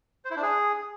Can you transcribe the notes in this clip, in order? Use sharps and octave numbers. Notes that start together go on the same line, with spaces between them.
C5
E4
D4
G#4